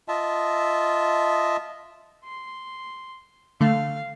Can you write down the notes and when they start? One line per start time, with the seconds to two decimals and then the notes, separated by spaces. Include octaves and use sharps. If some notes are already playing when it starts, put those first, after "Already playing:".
0.08 F4 D#5 E5 A5
2.24 C6
3.61 D3 A3 F5